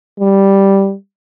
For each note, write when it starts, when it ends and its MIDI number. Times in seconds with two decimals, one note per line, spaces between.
0.20 0.93 55